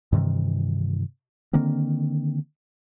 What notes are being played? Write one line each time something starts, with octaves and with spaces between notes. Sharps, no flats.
G2 C3 D#3 E3
D3 D#3 A#3 C4